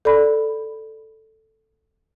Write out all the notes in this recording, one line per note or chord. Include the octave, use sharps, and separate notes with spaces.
A4 D5 B5